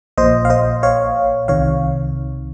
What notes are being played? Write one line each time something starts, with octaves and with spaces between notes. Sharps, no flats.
A#1 A#2 C5 D#5
F5
C5 D#5
C#5 F5
C2 C3 D#3 C#5 F5